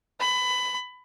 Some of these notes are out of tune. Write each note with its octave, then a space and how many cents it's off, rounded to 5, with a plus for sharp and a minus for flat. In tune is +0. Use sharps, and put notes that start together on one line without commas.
B5 +20